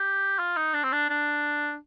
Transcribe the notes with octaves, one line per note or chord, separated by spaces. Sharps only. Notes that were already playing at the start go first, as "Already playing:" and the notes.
Already playing: G4
F4
D#4
D4
C4
D4
D4